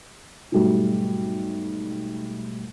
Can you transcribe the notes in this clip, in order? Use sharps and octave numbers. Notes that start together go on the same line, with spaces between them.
G#2 B2 F#3 G3 A3